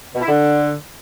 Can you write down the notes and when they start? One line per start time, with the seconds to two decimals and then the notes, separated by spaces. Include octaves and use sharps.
0.15 B2
0.21 E4
0.28 D3